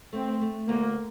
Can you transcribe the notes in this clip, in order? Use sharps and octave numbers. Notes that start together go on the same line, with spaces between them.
A3 C4
A3
D2 A#3